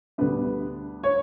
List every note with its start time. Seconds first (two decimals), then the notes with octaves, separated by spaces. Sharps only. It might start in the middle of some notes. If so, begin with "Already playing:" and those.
0.18 D2 D3 G3 B3 D4 B4
1.03 C#5